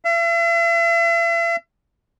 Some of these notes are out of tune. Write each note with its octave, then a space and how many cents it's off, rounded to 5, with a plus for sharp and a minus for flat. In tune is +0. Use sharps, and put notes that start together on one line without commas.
E5 +45